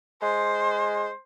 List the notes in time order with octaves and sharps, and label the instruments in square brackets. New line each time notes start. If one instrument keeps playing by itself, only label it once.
[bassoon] G#3 [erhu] C5